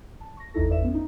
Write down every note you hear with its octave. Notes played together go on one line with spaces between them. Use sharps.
A5
C#6 A#6
A1 E2 D#4 E4 A4 A#6
G1 E2 B4 D5 E5 E7
B3 C#4
D#4